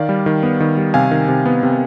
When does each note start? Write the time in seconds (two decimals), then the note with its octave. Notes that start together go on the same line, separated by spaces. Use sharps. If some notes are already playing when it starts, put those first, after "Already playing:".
Already playing: D#3 D5 F5
0.09 G3
0.26 D#3
0.43 B3
0.60 D#3
0.77 G3
0.94 C3 F5 G#5
1.11 D#3
1.28 C3
1.46 B3
1.63 C3